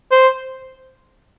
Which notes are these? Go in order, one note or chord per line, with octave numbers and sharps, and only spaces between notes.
C5